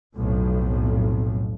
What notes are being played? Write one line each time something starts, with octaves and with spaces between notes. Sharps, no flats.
B1 F2 A2